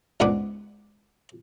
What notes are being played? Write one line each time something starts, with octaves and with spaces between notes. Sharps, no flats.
C#2 G#2 B3 D4 B4 D6